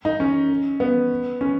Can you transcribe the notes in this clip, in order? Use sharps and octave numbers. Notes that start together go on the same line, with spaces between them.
D#4
C#4
B3
C#4